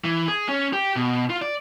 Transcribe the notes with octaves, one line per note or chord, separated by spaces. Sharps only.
E3
G#4
C#4
G4
B2
F4
D5